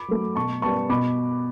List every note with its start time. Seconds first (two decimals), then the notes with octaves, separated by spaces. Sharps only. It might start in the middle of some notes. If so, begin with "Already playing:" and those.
Already playing: B5 D6
0.08 F#3 A3
0.35 B2 A5 C#6
0.62 G3 B3 A5 C#6
0.90 B2 B5 D6